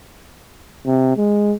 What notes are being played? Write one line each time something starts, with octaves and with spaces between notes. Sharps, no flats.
C3
G#3